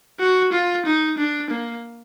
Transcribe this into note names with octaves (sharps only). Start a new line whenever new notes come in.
F#4
F4
D#4
D4
A#3